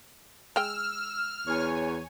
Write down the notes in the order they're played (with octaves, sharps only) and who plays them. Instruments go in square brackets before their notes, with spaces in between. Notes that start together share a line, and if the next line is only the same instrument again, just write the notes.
[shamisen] G#3 G5 [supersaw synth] E6 [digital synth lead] F6
[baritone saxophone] E2 [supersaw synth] C#5 G#5